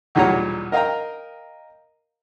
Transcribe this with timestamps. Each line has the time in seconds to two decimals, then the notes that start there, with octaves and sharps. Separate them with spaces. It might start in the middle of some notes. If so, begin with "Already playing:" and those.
0.15 B1 E2 A#2 G3 C#5 A#5
0.72 A#4 D#5 F5 G5 A#5